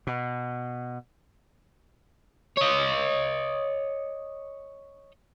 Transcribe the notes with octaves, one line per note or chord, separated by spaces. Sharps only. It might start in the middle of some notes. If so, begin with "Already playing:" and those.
B2
C#5 D#5